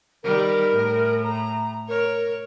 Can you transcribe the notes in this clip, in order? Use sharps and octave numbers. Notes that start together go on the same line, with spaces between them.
D#3 G3 A#4
A2
A#5
A#4 C#5